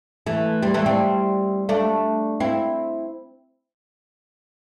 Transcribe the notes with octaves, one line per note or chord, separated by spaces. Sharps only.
E3 A3
G3 C4
E3 A3
G3 C4
A3 D4
C4 E4